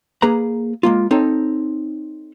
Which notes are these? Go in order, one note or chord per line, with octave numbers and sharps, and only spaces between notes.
A#3 G#4 B4 A#5
G#3 A#3 F4
C4 D#4 A4 C#5